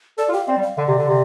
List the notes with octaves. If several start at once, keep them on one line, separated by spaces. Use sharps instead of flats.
A4 D5
F4
G4 F5
C4 D5
G3
F5
D3 D5
C3
D3
C3